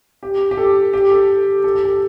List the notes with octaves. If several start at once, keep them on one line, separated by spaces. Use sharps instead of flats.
G4
G4
A4
G4
A4
A4
G4
A4